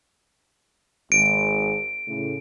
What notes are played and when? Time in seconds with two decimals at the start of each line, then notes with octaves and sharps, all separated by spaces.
1.12 G#1 G#3 D7
2.08 A2 C#3